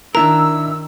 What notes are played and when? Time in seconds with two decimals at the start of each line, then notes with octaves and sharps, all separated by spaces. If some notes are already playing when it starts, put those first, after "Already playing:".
0.15 D#3 D4 E4 A#4 A#5 E6